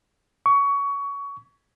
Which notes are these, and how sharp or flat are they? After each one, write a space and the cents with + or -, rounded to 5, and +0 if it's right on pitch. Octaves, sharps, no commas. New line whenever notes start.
C#6 +25